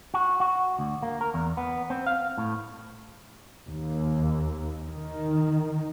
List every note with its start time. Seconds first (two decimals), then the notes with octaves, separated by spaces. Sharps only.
0.14 F#4
0.40 F#4
0.79 D2
1.02 A#3
1.21 A#4
1.34 E2
1.57 B3
1.90 C4
2.06 F5
2.38 A2
3.68 D#2
4.90 D#3